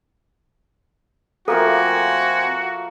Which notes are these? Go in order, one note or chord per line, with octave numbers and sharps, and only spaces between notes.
F3 A3 A#3 C4 F#4 A4 A#4 G#5